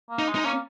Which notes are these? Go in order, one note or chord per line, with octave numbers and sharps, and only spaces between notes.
A#3
D#4
G#3
D#4
A#3 C#4